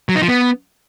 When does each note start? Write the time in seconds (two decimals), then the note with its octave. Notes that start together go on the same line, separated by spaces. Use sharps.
0.09 F#3
0.15 D#4
0.22 F3
0.29 B3